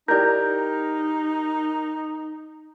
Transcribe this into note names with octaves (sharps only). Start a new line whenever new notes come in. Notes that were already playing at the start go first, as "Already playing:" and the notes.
D#4 E4 G4 A#4 D5 G6